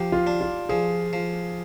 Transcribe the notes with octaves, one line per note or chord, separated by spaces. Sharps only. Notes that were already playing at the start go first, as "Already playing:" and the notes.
Already playing: F3 G4
F4
D4
F4
F3 G#4
F3